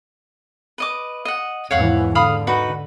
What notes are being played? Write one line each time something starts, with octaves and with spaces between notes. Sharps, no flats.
B4 D#5 D6
D#5 F#5
E2 G#2 E3 C#5 F5 F#5
D3 F5 B5 D#6
D#4 F#4 B4